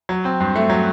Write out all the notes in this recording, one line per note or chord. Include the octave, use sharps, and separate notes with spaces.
F#3
C4
G2
A3
F#3